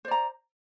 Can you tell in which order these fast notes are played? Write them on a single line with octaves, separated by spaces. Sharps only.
C5 D5 A#5